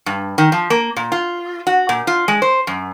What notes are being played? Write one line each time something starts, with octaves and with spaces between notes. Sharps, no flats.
G2
D#3
F3
A#3
A#2
F4
F#4
A#2
F4
G#3
C5
F#2